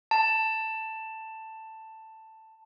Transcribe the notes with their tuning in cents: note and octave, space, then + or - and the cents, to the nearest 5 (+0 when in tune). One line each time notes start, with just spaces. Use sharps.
A5 +10